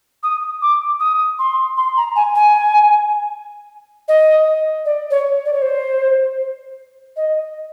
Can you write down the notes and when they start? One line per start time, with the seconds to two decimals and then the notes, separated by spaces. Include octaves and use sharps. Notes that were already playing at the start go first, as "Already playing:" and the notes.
0.23 D#6
0.62 D6
1.00 D#6
1.39 C6
1.77 C6
1.97 A#5
2.16 G#5
2.35 G#5
4.08 D#5
4.85 D5
5.11 C#5
5.46 D5
5.53 C#5
5.62 C5
7.17 D#5